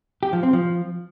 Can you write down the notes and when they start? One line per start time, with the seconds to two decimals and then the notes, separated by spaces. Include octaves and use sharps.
0.23 G4
0.33 F3
0.43 C4
0.53 F3